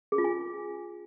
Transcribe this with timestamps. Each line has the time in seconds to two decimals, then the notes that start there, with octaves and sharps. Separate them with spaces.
0.12 G#4
0.18 F4
0.24 G#5